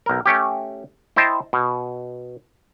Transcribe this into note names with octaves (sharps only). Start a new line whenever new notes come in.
B1 A#4
A3 C#4 G4
E4 C5 D#5 G5 A5
B2